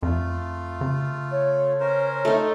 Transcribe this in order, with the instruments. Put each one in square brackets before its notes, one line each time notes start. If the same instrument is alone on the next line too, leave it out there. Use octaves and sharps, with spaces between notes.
[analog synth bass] F2 [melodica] A3 F4
[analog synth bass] C#3
[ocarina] C#5
[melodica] C#4 A#4 C5
[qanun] A3 D#4